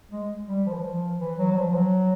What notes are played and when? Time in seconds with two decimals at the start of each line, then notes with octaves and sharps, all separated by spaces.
0.11 G#3
0.48 G3
0.66 F3
0.73 E3
0.80 F3
1.20 E3
1.38 F#3
1.52 F#3
1.57 F3
1.71 F3
1.75 F#3